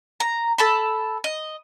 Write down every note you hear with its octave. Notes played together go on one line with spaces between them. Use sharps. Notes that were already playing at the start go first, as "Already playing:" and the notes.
A#5
A4 A5 B5
D#5